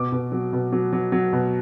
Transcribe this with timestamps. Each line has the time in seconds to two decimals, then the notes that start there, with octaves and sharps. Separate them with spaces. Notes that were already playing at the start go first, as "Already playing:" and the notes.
Already playing: B2 D6
0.12 B2
0.32 F#3
0.53 B2
0.72 F#3
0.93 F#3
1.12 F#3
1.33 B2